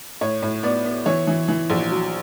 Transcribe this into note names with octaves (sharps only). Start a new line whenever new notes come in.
A2 C#5
A2
B3 D5
B3
E3 C#5
E3
E3
A#1
F#3